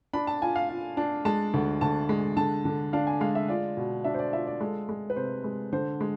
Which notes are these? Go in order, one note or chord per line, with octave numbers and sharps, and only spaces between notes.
D4 B5
A5
F4 G#5
F5
F4
D4
G#3 A5
D2
D2 A5
G#3
D3 A5
D3
D4 F5
G#5
G#3 F5
E5
F4 D5
B2
D4 E5
C5
D5
F4 E5
D5
G#3 A4
G#3
B4
C3 C5
G#3
D3 C5
G#3